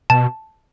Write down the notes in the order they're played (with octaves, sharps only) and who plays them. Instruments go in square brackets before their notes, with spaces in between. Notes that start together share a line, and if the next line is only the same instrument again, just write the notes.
[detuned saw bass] B2 [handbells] A5